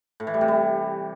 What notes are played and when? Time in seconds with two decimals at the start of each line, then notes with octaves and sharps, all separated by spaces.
0.20 A2
0.27 E3
0.34 G3
0.41 C3
0.48 G3